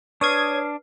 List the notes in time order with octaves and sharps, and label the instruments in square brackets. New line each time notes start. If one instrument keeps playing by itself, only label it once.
[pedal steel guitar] D4 [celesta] B4 F6 C7 [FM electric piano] C#5 D#6 G#6